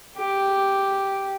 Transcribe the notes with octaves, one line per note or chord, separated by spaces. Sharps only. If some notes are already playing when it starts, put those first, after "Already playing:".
G4